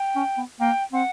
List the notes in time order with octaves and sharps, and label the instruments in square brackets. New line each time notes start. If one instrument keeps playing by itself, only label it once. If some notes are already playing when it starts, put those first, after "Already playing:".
Already playing: [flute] G5
[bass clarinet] C#4
B3
[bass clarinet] A#3 [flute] G5
[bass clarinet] C4 [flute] F#5